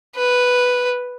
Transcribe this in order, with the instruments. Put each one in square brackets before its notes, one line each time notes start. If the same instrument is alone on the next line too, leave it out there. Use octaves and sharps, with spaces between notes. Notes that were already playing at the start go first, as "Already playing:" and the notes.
[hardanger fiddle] B4